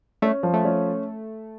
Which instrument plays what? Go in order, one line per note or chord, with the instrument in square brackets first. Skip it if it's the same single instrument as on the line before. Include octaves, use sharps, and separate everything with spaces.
[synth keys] A3 [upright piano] C#4
[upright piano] F3
[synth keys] A3
[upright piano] C#4